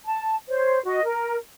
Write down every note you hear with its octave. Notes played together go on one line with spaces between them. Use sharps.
A5
C5 C#5
F#4 D#5
A#4